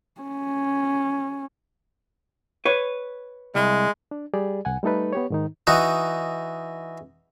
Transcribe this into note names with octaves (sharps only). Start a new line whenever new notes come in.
C#4
B4 C#5
C2 G#3
D4
G3 G4 G#4 D5
C2 F#5 G#5
G3 A3 D#4 A4 B4
B3 G4 C#5
G#2 D#3 D#4
E3 D#4 F#4